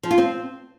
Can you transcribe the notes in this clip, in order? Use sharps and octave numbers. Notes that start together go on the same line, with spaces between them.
F3
F4
C4